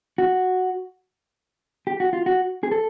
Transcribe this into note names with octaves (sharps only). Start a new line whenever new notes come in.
F#4
G4
F#4
F4
F#4
G#4
A4